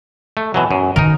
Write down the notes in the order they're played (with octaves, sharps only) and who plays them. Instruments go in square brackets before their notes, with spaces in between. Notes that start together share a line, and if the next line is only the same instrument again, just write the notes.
[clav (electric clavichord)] A3
B2 E3 F#3
F#2
[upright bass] D#3 [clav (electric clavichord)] D#4 A#4